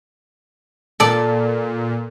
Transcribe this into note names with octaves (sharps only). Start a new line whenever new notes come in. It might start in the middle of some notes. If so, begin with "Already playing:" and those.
A#2 A4 D5